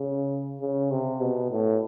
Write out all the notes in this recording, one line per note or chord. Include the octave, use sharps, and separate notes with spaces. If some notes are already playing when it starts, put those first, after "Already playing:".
Already playing: C#3
C#3
C3
B2
A2